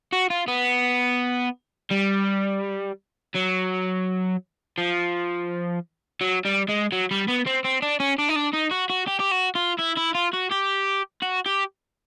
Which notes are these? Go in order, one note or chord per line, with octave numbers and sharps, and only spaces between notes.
F#4
F4
B3
G3
F#3
F3
F#3
G3
G#3
F#3
G3
B3
C4
C4
D4
C#4
D4
D#4
D4
D#4
F#4
F#4
G4
G4
F#4
F4
E4
E4
F4
F#4
G4
F#4
G4